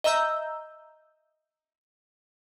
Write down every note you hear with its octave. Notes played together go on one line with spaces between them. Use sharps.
D#5 E5 A#5 E6 G6